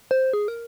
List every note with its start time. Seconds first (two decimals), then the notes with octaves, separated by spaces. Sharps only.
0.11 C5
0.33 G#4
0.48 A#4